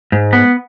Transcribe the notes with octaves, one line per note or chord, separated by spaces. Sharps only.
G#2
B3